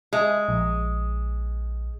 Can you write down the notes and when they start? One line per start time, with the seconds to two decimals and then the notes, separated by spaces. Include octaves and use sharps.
0.13 G#3 E5
0.49 A#1